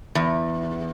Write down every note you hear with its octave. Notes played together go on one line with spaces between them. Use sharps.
E2